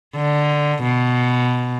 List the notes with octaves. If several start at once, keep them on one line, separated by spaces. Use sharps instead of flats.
D3
B2